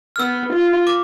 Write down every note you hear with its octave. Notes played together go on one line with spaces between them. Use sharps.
F6
B3 E6
F4
D6